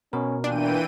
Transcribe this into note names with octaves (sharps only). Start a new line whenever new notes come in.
B2 C#4 A#4
A#2 E3 D4 G5 D#7